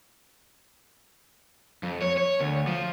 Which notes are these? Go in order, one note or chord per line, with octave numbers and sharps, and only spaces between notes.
F2
C#5
C#5
D2
F3